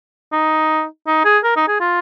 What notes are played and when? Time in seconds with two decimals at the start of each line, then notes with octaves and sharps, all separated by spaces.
0.32 D#4
1.07 D#4
1.25 G#4
1.44 A#4
1.56 D#4
1.68 G#4
1.80 F4